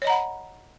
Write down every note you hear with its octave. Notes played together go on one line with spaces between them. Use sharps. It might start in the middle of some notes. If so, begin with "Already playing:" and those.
C#5 D#5 F#5 A#5 B5